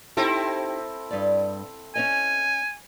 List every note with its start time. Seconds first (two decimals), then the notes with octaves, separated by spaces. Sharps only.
0.17 C4 D#4 E4 G4 A4
1.10 G2 D5
1.95 C#4 C#5 D#5 G#5